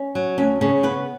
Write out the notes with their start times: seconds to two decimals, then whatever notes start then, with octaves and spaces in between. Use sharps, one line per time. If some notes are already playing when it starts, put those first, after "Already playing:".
Already playing: C#4
0.15 F#3
0.38 D2 C#4
0.61 C#3 C#4
0.83 B3 B4